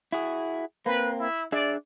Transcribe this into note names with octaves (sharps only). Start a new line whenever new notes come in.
E4 F#4 G#4
A#3 C4 B4
E4
D4 G#4 D5 E5